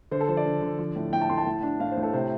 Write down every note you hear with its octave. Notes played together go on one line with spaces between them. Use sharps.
D3 C5
A4
F3 C5
D5
D3
D3
F3
A2
A2 G5
A5
A2 C6
A5
A2
D4
A2 F5
C5
A2
A4
C3 C5